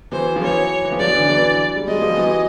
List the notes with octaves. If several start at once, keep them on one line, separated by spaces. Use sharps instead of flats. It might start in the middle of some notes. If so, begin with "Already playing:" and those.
E3 F#3 C5
F3
E3 F#3 C#5
E3
F3
E3 F#3 D5
D3 E3
E3 F#3
G3
F#3 G#3 D#5
F3 G3
E3 F#3